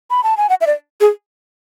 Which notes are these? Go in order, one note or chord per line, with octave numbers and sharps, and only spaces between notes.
B5
A5
G#5
F#5
E5
D5
G#4